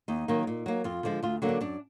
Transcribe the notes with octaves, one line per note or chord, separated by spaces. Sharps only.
D#2 D#4
D#3 F#3 A#3
A#2
F#3 A#3
F2 F4
D3 F3 G#3
D2 F4
D3 F#3 A#3
D4
F#2 D4